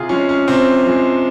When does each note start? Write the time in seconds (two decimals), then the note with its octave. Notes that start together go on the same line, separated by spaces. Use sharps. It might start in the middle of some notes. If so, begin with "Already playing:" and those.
Already playing: C3 F4 G#4
0.09 F3 G#3 C#4
0.29 C#4
0.48 C3 C4
0.86 F3 G#3